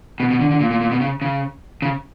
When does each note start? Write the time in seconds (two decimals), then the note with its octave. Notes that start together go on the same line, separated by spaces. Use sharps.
0.20 B2
0.31 B2
0.40 D3
0.51 D3
0.60 A#2
0.71 A#2
0.81 A#2
0.91 B2
1.01 C#3
1.22 C#3
1.82 C#3